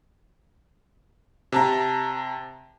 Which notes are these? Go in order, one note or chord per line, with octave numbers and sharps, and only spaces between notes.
C3 A5 A#5